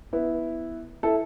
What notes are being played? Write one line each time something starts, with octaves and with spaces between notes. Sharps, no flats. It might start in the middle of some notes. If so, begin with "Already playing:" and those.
B3 E4
E4 A4